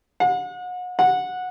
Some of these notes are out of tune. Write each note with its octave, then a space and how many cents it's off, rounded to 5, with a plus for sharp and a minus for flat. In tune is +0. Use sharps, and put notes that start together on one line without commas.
F#5 -35
F#5 -15